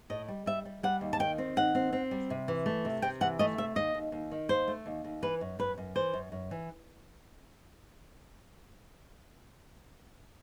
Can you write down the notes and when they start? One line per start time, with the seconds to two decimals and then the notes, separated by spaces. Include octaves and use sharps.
0.10 A2 D#5
0.28 G3
0.46 G3 E5
0.65 G3
0.83 G3 F#5
1.01 D#2
1.13 A5
1.20 D#3 G5
1.38 C4
1.56 D#3 F#5
1.75 C4
1.93 C4
2.11 G3
2.30 C3
2.48 E3
2.66 A3
2.85 C3
3.02 C3 G5
3.21 E3 F#5
3.39 A3 D#5
3.58 C3 E5
3.76 D#2 D#5
3.94 D#2
4.12 D#2
4.31 D#3
4.49 D#2 C5
4.68 A3
4.86 D#2
5.04 D#2
5.22 E3 B4
5.41 F#2
5.59 F#2 B4
5.78 F#2
5.96 E3 C5
6.14 F#2
6.32 F#2
6.51 E3